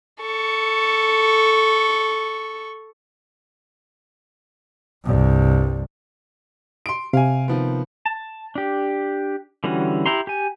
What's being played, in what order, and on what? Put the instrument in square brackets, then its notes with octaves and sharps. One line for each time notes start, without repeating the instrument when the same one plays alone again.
[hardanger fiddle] A4 C#6
[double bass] C2 G2
[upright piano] C6 D7
[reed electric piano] C3 [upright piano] F5 G#5
[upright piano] D#3 F3 B3
[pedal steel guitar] A5
D4 G4
D3 E3 G3 C#4 F#4
E4 G4 A#5 C6
G4 G#5